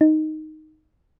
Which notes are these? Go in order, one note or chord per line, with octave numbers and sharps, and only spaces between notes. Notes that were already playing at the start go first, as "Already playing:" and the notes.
D#4